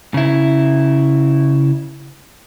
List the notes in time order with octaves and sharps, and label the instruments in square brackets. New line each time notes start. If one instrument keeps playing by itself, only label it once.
[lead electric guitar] C#3 E4